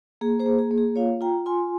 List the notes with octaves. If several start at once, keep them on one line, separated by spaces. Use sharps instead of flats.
A#3 G#4
G#4 C5
A#3
G#4
A#3
G#4
F4 C#5 F5
F4 G5 A#5
F4 G#5 C6